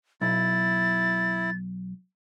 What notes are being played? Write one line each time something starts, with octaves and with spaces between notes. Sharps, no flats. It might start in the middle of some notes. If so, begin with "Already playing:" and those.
B1 E4 A6